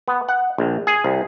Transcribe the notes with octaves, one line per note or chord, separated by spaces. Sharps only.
B3
F#5
A#1
G#4
C2